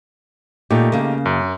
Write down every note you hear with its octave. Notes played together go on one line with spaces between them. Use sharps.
A#2 A3 D#4 G4
C#3 A#3
F#2